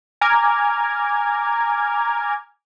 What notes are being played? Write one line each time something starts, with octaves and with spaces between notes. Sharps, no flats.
G#5 A#5 D6 F6 G#6